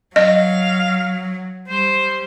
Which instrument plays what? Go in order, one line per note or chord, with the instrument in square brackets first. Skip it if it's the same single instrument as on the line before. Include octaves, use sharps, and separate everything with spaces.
[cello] F#3 [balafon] D#5 [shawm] F5
[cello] G3 [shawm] C5